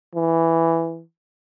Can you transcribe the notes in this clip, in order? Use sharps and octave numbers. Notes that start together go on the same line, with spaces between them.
E3